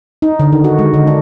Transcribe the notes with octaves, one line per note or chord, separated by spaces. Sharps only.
D#4
D3
D#3
F#4
G#3
D3
D4